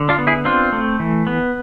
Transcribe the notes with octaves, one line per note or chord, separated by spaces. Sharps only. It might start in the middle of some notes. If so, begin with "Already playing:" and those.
Already playing: D3
D4 F4
B3
E4 G#4
C4 D4 F4
A3
E3
B3